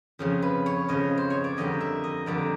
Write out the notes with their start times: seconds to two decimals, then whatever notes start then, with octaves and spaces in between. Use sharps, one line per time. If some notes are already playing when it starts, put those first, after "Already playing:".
0.19 F2 C#3 F3
0.42 B4
0.66 C#5
0.88 F2 C#3 F3 D#5
1.17 C5
1.30 C#5
1.44 D5
1.57 F2 D3 G3 A#3 D#5
1.80 E5
2.04 D#5
2.26 F2 D3 G3 A#3 D5